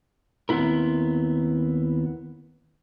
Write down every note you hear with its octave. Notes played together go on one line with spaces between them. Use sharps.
D#2 B3 C4 E4 A#4